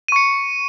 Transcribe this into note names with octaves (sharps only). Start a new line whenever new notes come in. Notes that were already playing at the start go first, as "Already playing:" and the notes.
C#6 C#7 D#7